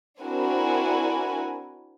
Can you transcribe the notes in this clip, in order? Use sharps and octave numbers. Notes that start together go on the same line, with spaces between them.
C4 D4 E4 F#4 A#4 G#5